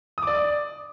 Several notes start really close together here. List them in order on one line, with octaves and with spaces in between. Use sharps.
D#6 D6 D5